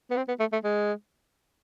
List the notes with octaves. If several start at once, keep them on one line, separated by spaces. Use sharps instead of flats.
B3
C4
B3
A3
A3
G#3